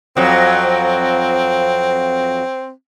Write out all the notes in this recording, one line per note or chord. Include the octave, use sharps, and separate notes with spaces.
F2 F#3 C4